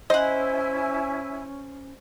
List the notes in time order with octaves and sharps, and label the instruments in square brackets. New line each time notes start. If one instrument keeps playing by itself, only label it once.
[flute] C#4 [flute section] E4 G#5 [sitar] C5 [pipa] D#5 F#5